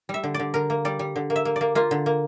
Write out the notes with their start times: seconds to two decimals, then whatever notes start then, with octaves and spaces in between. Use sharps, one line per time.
0.09 G3 E5
0.23 D3
0.34 D5
0.39 D3
0.54 D3 A#4
0.70 A#3
0.85 G3 D5
0.99 G3
1.16 D3
1.30 A#3
1.36 E5
1.45 A#3
1.56 A#3 D5
1.75 A#3 F4
1.91 D3
2.06 A#3